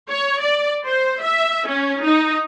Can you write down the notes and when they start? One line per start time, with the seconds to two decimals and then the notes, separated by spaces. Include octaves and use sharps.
0.11 C#5
0.40 D5
0.86 C5
1.21 E5
1.67 C#4
2.02 D#4